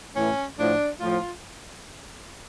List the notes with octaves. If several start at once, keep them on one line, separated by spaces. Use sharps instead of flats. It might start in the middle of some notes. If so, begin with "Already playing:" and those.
A2 E3 C#4
A2 F3 D4
A2 F3 F4